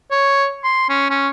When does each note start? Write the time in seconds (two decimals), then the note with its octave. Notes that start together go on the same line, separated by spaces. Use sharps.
0.11 C#5
0.64 C6
0.89 C#4
1.10 C#4